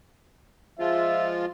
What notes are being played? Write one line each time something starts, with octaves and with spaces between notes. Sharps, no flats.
F3 G#3 F4 E5